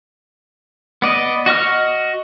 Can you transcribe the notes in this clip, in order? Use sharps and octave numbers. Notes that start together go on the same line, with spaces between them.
B3 D5 D#5
F#4 D#5 C#6 F6